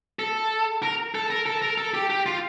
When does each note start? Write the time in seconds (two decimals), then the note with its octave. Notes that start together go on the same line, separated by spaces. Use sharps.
0.19 A4
0.83 A#4
1.15 A4
1.30 A#4
1.46 A4
1.62 A#4
1.78 A4
1.94 G4
2.10 G4
2.26 F4